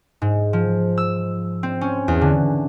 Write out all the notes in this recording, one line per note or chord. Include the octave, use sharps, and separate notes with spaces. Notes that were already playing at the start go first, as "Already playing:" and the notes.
G#2
F3
E6
C4
C#4
E2
D3